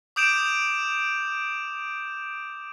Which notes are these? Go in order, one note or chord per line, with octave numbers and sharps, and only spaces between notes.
D6 D#6 G6 D7 E7 F7